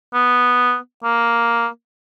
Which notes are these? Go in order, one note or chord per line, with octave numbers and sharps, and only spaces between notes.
B3
A#3